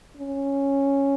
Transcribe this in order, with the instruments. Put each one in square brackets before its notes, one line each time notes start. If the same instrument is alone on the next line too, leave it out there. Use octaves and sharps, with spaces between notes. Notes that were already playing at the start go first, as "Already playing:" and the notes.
[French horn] C#4